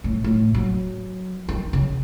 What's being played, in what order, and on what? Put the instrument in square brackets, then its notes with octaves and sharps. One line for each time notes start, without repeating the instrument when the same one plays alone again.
[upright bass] A2
A2
F#3
D#3
C#3